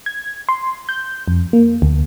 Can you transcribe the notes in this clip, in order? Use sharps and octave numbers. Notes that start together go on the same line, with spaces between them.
G#6
C6
G6
F2
A#3
D2